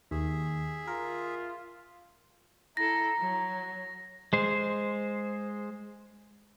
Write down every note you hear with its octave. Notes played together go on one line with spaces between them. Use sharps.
D#2 G#4 E5
F4 A#4
E4 A4 A#5 A#6
F#3
G#3 C5